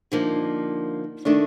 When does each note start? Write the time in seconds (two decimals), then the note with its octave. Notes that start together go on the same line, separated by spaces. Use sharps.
0.12 D3 F3 A#3 D#4
1.25 D#3 A3 D4